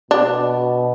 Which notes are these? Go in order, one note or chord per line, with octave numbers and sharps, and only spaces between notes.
B2 D4